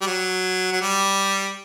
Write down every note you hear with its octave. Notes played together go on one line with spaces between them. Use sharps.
G3
F#3
F#3
G3